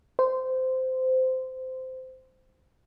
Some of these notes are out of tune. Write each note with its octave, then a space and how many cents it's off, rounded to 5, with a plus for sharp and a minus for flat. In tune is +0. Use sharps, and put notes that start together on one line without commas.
C5 -15